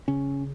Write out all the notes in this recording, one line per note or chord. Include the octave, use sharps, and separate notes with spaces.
C#3 C#4